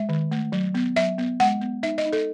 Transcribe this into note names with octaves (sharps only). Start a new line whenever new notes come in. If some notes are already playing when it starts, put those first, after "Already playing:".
Already playing: G#3 E5
D#3
A3
F#3
B3
F#3 E5
B3
G#3 F#5
B3
D#4 E5
D#5
D#4
A4